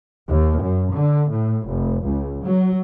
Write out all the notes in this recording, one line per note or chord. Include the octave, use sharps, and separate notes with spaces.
D#2
F#2
D3
A2
F1
C#2
F#3